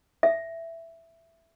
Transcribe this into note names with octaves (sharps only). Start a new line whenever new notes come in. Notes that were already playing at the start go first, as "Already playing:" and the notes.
E5